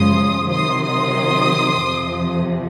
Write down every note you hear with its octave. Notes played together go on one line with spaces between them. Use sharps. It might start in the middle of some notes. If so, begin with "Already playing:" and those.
Already playing: F#2 C#3 F3 G#3 C6 D#6
C3 D#3 F#3 C6 D#6
C6 D#6
F2 C3 F3